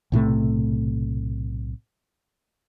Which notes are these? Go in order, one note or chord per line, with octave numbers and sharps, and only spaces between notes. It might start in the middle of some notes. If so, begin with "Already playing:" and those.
B1 A2 C3 A3